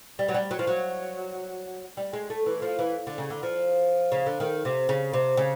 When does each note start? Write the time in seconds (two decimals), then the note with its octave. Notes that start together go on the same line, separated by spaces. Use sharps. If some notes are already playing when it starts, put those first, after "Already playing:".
0.19 G3
0.29 F#3
0.34 G3
0.51 F#3
0.59 F3
0.67 F#3
1.97 G3
2.13 G#3
2.30 A3
2.46 E3
2.62 F3
2.79 E3
3.07 D3
3.18 C#3
3.30 D3
3.43 F3
4.12 C#3
4.26 D3
4.40 D#3
4.65 C3
4.89 C#3
5.13 C3
5.37 C#3